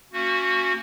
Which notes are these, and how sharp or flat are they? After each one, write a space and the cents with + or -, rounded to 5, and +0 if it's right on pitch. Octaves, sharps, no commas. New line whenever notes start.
A#3 -35 C#4 +0 F#4 -10